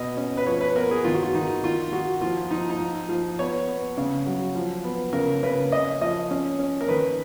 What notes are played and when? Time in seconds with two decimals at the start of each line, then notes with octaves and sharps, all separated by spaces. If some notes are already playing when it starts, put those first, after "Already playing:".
Already playing: B2 D#5
0.17 C#4
0.37 B4
0.47 F3 C#5
0.61 B4
0.76 B3 A#4
0.91 G#4
1.05 D#3 F4
1.14 F#4
1.23 F4
1.34 D#3 D#4
1.63 D#3 F4
1.92 D#3 F#4
2.21 F3 F4
2.51 F3 D#4
2.70 D#4
2.80 F3
3.09 F3
3.39 B3 C#5
3.67 B3
3.97 C#3
4.27 F#3
4.55 F3
4.84 B3
5.13 C#3 A#4
5.43 C#3 B4
5.72 C#4 D#5
6.01 F3 D#5
6.31 C#4
6.59 C#4
6.81 A#4
6.88 D#3 B4